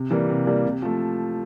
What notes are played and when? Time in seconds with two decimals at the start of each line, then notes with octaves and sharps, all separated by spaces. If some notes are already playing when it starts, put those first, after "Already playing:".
Already playing: C3
0.10 E3 G3 A#3
0.29 C3
0.47 E3 G3 A#3
0.64 C3
0.82 F3 A3